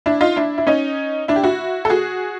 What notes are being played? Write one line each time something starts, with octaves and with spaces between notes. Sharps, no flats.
D4 E4
D#4 F4
D4 E4
E4
C#4 D#4
D4 E4
G4
E4 F#4
A4
F#4 G#4